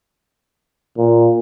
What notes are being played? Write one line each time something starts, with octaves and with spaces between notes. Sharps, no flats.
A#2